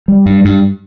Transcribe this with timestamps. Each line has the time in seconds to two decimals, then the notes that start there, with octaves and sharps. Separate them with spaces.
0.08 G3
0.26 G2
0.45 G2